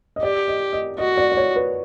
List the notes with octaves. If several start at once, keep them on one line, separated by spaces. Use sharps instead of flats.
D#5
G4 D5
D#5
D#5
F#4 D#5
D5
D5
C#5
B4